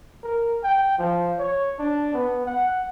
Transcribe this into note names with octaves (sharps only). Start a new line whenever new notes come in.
A#4
G5
F3
C#5
D4
B3
F#5